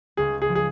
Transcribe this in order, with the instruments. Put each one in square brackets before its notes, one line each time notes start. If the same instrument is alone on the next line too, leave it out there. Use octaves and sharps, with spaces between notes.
[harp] C#2 [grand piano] G#4
[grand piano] G#4
[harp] F3
[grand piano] G#4